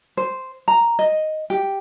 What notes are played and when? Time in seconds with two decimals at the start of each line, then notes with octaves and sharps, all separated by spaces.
0.17 C5
0.68 A#5
0.99 D#5
1.50 G4